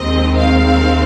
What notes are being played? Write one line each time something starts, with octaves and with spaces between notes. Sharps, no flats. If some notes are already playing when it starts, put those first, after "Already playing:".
Already playing: D#2 D#3 G#3 C4 D#5
F5